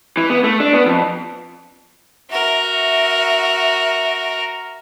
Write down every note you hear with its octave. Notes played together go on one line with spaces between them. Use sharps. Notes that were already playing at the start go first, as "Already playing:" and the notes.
E3
B3
A3
D4
B3
F2
F#4 A#4 E5